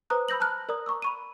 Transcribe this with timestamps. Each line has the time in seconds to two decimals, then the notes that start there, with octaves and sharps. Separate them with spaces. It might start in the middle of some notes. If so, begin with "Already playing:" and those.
0.10 B4 C5 A#5 D6 D#6 F#6
0.28 B5 E6 G6 A#6 F#7
0.40 A5 A#5 F6 F#6
0.69 A#4 D5 A#5 D#6
0.86 A#5 C#6 D6 E6
1.02 B5 C#6 D#7